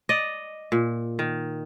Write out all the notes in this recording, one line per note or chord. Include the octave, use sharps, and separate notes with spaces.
D5 D#5
A#2
D#3